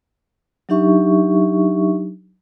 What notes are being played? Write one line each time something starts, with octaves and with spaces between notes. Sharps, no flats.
F#3 D4 D#4 G4 E5 C#6